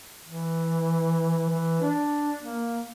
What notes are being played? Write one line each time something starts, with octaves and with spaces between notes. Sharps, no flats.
E3
E3
D4
A#3